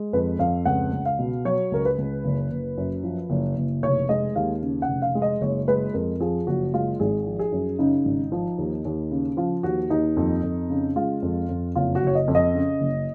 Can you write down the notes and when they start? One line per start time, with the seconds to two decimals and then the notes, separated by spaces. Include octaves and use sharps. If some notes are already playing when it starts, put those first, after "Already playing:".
Already playing: G#3
0.13 F2 B4
0.39 F2 F5
0.65 C#2 F#5
0.93 C#2
1.06 F5
1.19 B2
1.45 F#3 C#5
1.72 C#2 A#4
1.85 B4
1.98 C#2
2.24 F#1
2.51 F#1
2.77 F#2
3.03 F3
3.30 F#1
3.56 F#1
3.83 F1 C#5
4.09 G#3 D#5
4.35 D#2 F5
4.62 C#3
4.82 F#5
4.88 F1
5.02 F5
5.15 G#3
5.22 D#5
5.41 F#1 C#5
5.68 G#3 B4
5.94 F2 A#4
6.20 F3 G#4
6.47 F#1 F#4
6.73 G#3 F4
7.00 G#1 G#4
7.26 F3
7.39 G#4
7.52 F#2
7.79 C#3 D#4
8.05 G#1
8.32 F3
8.58 D#2
8.85 D#2
9.11 C#3
9.37 F3 F4
9.63 D#2 F#4
9.90 D#2 D#4
10.17 F2
10.43 F2
10.70 C#3
10.96 G#3 F4
11.22 F2
11.49 F2
11.76 F#1 F4
11.95 F#4
12.02 F#1
12.07 C#5
12.15 D#5
12.28 F2
12.35 D#5
12.55 C#3
12.81 F#1